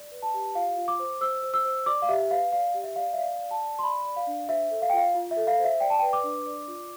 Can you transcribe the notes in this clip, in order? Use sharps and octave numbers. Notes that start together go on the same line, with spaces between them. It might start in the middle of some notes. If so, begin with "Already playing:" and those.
Already playing: D5
B4
A5
G4
F4 F5
F4
D6
C5
C5 E6
C5
E6
C5
D5 D6
F5
G4 E5
B4 F5
D5 F5
G4
E5
D5 F5
E5
D5 F5
D5
A5
D5
C6
D5 B5
D5
F5
D4
C5 E5
A4
F5
G5
F4 F5
F4
E5
A4
F5
C5
E5
D5 G5
A5
B4 G5
D6
D4
D5
F4